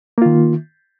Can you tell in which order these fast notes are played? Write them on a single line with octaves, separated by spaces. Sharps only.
A#3 F4 D#3